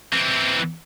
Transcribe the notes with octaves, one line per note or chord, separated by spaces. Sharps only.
E3 C4